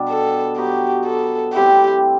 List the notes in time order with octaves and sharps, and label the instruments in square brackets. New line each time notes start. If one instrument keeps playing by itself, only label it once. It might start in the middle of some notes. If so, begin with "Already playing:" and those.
Already playing: [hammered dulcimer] B2 G3 D4
[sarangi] A4
[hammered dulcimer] F#3 B3 F#4 [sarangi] G4
[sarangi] A4
[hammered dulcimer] A2 G3 C4 E4 [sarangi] G4